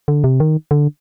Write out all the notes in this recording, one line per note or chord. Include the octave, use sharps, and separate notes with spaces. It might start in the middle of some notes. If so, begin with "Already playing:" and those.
D3
C3
D#3
D3